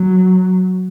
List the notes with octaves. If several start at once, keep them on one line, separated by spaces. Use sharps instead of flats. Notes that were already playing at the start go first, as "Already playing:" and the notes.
Already playing: F#3